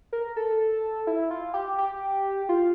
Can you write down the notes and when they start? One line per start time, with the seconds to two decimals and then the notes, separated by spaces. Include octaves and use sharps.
0.13 A#4
0.36 A4
1.07 E4
1.31 F4
1.54 G4
1.78 G4
2.49 F4